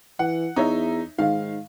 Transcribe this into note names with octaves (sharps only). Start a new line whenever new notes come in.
E3 F#5
E2 D#4 C#5 E5
G#2 D#3 F5